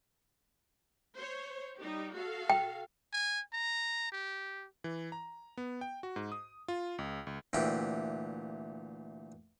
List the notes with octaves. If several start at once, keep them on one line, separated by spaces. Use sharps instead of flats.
C5 C#5
G3 D#4 G4
F#4 A4 F5
G5
G#5
A#5
G4
E3
A#5
B3
G5
F#4
G#2
D#6
F4
C#2
C#2
D2 A#2 E3 G4